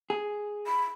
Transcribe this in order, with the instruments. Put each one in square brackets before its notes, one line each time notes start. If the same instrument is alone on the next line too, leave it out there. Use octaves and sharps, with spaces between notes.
[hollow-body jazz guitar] G#4
[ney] B5